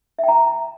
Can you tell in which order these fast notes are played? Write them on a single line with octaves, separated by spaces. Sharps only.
E5 G5 A#5